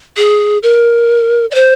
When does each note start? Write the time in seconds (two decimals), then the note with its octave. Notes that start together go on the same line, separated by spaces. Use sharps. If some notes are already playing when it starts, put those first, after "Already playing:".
0.17 G#4
0.63 A#4
1.51 D5
1.55 C5